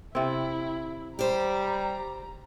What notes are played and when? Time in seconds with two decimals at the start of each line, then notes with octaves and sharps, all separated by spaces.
0.15 C3 C4 E4
1.19 G3 G4 C5 A#5